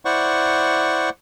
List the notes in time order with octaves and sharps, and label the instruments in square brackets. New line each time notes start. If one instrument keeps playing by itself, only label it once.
[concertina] E4 C5 D5 F#5 C#6